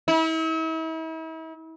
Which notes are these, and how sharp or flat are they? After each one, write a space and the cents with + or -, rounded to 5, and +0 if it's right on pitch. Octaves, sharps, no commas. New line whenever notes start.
E4 -40